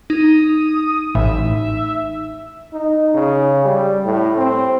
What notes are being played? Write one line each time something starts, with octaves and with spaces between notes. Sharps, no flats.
D#4 D#6
A1 A2 E5
D#4
C#3
G3
A2
C4